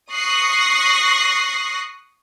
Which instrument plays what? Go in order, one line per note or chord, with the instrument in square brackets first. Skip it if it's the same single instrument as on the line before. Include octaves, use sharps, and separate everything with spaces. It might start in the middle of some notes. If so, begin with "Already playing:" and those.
[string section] C#6 D#6 F#6 A#6 C7